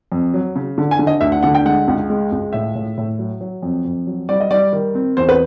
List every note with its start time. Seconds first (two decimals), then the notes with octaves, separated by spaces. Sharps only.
0.12 F2
0.34 F#3
0.56 C#3
0.78 D3
0.91 G#5
0.99 D3
1.07 D#5
1.21 D2 E5
1.32 F#5
1.43 D3 F#5
1.55 G5
1.65 G#3 F#5
1.88 C#2
2.10 G#3
2.32 C#2
2.53 A2 E5
2.75 A2
2.98 A2
3.19 F#3
3.41 F#3
3.63 F2
3.85 F2
4.07 F#3
4.29 G3 D5
4.40 D#5
4.51 G3 D5
4.73 D#3
4.95 C4
5.17 E2 C5
5.29 B4